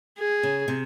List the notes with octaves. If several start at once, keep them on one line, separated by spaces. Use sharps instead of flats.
G#4
C#3
C3